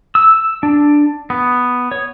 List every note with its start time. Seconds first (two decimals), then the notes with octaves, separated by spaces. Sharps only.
0.15 E6
0.63 D4
1.30 B3
1.92 C#5